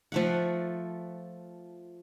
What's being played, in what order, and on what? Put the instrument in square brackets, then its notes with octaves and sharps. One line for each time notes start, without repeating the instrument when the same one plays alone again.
[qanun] F3 A3 F#5